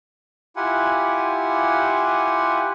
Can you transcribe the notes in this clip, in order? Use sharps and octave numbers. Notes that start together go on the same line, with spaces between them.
E4 F4 G4 F#5 G#5